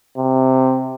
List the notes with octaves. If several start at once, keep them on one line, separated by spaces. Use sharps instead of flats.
C3